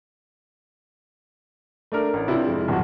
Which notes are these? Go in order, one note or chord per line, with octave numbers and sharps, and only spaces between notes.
A3 D4 A#4
A1
C3 D4 E4 F4 B4
F2 G#3
D#1 G#1 F2 F#3 F#4